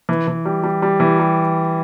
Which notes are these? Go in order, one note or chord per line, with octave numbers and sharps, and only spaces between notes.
E3
E3
G3
G3
G3
E3
G3